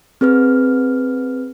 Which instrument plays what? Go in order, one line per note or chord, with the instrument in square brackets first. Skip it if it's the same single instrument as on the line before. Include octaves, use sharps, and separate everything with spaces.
[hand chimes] C4 G#4 B4 F6